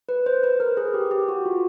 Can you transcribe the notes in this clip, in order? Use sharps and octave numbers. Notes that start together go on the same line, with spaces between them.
B4
C5
B4
A#4
G#4
G4
G4
F#4
F4